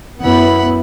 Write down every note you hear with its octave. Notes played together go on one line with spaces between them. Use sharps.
F#2 B3 E4 F#5 B5